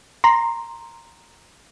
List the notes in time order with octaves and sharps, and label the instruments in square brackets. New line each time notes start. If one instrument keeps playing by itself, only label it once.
[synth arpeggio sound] A#5 C6